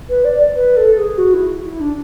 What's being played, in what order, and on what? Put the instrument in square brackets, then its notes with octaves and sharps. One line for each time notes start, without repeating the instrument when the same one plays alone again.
[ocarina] B4
D5
B4
A4
G#4
F#4
E4
E4
D4